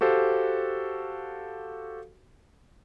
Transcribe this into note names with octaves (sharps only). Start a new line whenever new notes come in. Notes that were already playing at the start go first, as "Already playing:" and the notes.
F#4 G4 A4 C5 F5